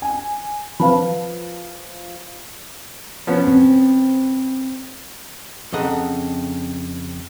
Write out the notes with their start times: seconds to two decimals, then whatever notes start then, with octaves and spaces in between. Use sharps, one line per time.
0.02 G#5
0.80 F3 B4 F5 A5 B5
3.27 F3 B3 C#4
3.48 C4
5.73 F2 C#3 A4 D#5 F#5 A#5